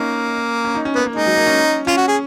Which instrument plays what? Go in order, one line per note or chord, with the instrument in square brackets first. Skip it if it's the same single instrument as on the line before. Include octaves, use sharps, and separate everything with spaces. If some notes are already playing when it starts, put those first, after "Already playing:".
Already playing: [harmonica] A#3 [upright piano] C#4 D#4
[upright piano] C#4
D#4
C#4
[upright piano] A#3 [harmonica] B3
[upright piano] A#3
[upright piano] G#3 [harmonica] D#4
[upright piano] F#3
A#3
C#4
[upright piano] C#4 [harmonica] F4
[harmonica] F#4
G#4